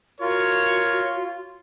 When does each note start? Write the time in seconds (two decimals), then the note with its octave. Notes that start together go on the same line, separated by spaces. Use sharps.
0.21 F4 F#4 A#4 C#5